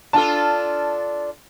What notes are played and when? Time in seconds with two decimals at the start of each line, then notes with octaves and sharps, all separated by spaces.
0.13 D4 F4 A4 A5